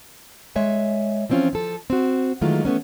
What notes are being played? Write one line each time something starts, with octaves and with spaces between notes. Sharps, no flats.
G#3 C#5 E5 G#5
E3 F3 C4 C#4 F4
F3 A4
C4 F#4
D#3 E3 F#3 G#3 A3 F4
E3 A3 B3 C#4